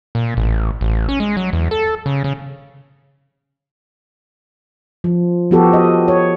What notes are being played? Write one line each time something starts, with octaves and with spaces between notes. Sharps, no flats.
A#2
A1
A1
C#4
G#3
F#3
E2
A4
C#3
C#3
F3
F3 B3 F#4 G4 A4
D#5
C#5